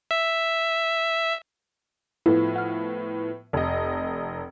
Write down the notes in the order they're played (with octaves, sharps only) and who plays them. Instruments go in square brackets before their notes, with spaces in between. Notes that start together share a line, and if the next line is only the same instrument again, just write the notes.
[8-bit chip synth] E5
[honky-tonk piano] A2 F3 B3 [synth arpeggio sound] E4 A4
[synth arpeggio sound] F#5 F6
[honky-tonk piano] F1 D#5